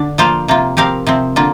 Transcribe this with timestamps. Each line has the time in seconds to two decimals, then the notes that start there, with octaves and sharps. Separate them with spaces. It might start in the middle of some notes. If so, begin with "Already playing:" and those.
Already playing: D3 D4
0.18 F3 A#3 F4 C5 F5
0.48 C3 A#3 F4
0.77 F3 C4 G4 A#4 F5
1.07 C3 F3 C4
1.36 D3 A#3 F4